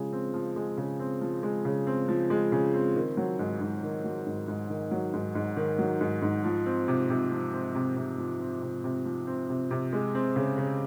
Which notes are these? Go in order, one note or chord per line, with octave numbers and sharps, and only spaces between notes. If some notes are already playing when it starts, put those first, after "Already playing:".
Already playing: C#3 F3 G#3
C4
F3
G#3
C#3
C4
F3
G#3
C#3
C4
F3
G#3
C#3
C4
D#3
F#3
G#2
G#2
D#3
F#3
G#2
G#2
D#3
F#3
G#2
G#2
D#3
F#3
G#2
G#2
F3
C4
C3
C3
F3
C4
C3
C3
F3
C4
C3
C3
F3
C4
C3
C3
G#3
C4
C#3
C#3